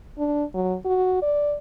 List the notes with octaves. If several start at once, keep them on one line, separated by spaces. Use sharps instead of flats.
D4
F#3
F#4
D5